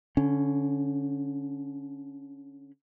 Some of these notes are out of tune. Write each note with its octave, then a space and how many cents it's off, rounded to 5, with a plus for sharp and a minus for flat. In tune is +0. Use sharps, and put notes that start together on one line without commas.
D3 -25 C#4 +0